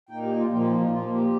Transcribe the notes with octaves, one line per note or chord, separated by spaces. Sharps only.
A#2 A#3 D#4 G5
G4
F4
A#2 F3 A#3 G4
F4
D#4
D#4
A#2 F3 A#3 F4
G4